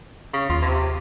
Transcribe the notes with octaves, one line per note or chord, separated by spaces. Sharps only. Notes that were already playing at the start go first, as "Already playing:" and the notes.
C#3
D#2 F4
C3